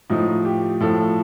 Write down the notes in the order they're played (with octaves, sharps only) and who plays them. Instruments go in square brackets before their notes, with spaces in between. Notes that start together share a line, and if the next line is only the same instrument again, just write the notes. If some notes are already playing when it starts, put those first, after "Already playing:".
[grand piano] A2 F3 D#4
G4
A2 F3 A4